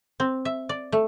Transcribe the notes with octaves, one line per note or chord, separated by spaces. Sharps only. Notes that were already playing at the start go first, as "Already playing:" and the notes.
C4
E5
D5
A3